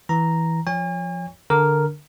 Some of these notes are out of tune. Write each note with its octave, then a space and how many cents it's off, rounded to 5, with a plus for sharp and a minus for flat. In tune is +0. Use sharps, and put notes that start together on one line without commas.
E3 -10 A#5 +0
F3 +0 C#5 +15 G#5 -40
D3 +0 A#4 +0